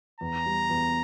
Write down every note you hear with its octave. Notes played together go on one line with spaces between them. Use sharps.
E2 A#5
G3
E2